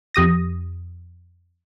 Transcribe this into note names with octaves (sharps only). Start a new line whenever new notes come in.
F2 G4 D#6 A#6